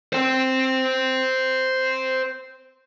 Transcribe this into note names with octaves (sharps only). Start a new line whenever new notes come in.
C5 G5